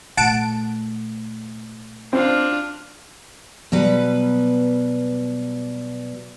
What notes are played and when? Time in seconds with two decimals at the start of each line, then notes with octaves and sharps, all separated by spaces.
0.17 A#2 A3 F#5 A5 D7
2.13 C4 D4 F4
3.72 B2 F#3 G3 B4 F#5